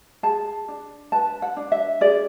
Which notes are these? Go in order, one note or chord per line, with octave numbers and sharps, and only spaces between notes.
G#4 A5
D4
B4 A5
F#5
D4
E5
G#4 D5